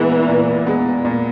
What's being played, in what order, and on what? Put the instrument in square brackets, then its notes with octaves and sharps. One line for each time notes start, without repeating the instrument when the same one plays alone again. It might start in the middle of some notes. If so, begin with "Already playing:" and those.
Already playing: [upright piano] A#2 G#3 B3 [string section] E3
[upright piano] A#2
G#3 B3
A#2